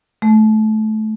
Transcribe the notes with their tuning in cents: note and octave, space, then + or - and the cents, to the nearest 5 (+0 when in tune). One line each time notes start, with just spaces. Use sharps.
A3 -20